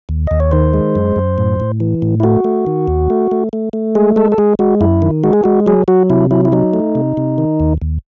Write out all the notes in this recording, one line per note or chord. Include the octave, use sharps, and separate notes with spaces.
D#2
D#2 D#5
C#5
D#3 C5
G#3
F#2
F#2
A2
A2
E3
A2
E4
A3 F#4
A3
D#3
D#2
A3
A3
A3
A3
G#3 G#4
G#3 A4
A4
G#3 G#4
G#3 F#4
F#2 E4
D#3
G#3 F#4
G#4
G#3 F#4
F#3 G#4
F#3 F#4
C3 E4
F#3 E4
E4
F#3 D#4
A3
C3
C3
D#3
D#2
D#2